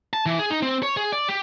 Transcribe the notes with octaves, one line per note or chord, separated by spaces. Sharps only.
A5
E3
G#4
D#4
C4
C#5
G#4
D5
G4